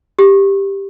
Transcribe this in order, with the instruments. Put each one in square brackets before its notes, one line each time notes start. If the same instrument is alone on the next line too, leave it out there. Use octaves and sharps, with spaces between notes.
[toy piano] G4